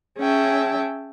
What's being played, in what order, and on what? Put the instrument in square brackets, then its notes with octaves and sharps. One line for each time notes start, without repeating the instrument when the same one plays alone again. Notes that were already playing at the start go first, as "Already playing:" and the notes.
[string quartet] C#4 G#4 E5 G5 A5